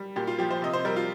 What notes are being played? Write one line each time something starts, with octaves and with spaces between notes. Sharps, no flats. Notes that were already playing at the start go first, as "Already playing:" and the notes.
Already playing: G3
A#2 G4
F4
F3 G4
C5
C3 D#5
C5
G3 A#4
F4